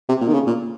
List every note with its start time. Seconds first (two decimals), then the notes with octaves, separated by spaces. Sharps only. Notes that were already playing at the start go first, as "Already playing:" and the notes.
0.09 C3
0.21 A#2
0.28 D#3
0.34 C#3
0.47 A#2